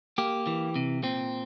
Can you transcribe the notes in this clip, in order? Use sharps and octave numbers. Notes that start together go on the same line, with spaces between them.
A#3 G4
E3
C3
A#2 C4